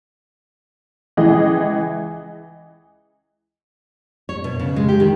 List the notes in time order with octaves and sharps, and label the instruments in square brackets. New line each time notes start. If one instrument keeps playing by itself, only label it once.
[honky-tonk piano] C#2 E3 G#4 D#5
[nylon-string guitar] C#5
B2
C#3
G#3
G4
D#3